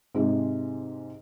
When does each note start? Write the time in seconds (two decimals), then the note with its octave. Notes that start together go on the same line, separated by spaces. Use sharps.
0.15 G#2 C3 G#3